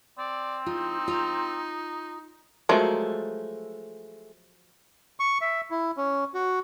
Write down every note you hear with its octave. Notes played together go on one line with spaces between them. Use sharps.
C4 D5
D#4 F4
F4 A#5
F3 F#3 G#3 A3 A#4
C#6
E5
E4
C#4
F#4